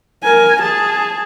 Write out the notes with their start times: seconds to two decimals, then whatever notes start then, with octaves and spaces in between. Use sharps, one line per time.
0.23 A#4 G#5
0.61 G#4 A5